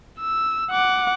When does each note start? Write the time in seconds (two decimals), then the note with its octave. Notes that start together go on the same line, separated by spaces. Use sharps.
0.19 E6
0.72 F#5 D6